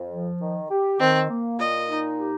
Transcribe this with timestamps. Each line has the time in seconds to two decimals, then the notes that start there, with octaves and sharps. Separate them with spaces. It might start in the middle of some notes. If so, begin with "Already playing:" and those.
Already playing: F2
0.11 F3
0.41 D#3
0.70 G4
1.00 D#3 C4
1.29 A#3
1.59 A#2 D#5
1.88 D#4
2.18 G4